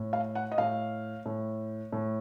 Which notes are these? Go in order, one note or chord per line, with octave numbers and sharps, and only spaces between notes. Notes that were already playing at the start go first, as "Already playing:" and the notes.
Already playing: A2
F5
F#5
D#5
A2 F5
A2
A2